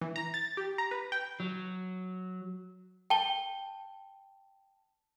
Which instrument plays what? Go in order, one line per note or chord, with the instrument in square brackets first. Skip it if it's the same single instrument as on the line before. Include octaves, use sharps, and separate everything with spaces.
[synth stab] E3
A#5
A6
G4
A#5
B4
G5
[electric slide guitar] F#3
[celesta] G5 A5 G7